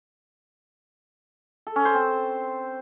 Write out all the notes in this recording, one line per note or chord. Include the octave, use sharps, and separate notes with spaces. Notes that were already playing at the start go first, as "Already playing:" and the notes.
A4
C#4
C5
C4